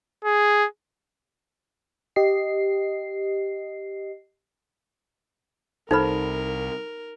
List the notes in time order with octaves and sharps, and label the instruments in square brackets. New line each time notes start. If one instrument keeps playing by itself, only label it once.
[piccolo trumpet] G#4
[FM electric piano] G4 D#5 C7
[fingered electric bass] C2 [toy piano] D#4 B5 [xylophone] A4 C5 F6 [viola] A#4